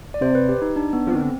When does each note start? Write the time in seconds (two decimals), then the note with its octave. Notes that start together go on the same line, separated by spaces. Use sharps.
0.14 D5
0.21 C3 C5
0.35 B4
0.49 G4
0.62 D#4
0.76 D4
0.93 B3
1.07 F3
1.12 C4
1.15 D#3
1.22 D3